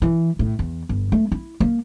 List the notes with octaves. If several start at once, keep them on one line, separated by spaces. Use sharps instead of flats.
E3
A2
E2
G1
A3
E4
A#3